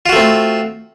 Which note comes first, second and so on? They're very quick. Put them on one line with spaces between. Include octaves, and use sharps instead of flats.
F4 F#4 A3 C4